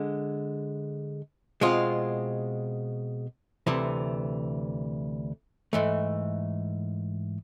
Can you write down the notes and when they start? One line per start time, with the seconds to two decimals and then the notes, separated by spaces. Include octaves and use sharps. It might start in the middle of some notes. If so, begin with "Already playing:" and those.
Already playing: D3 G#3
1.61 B2 G#3 C4 F4
3.67 D2 C3 E3
5.73 G#2 E3 A3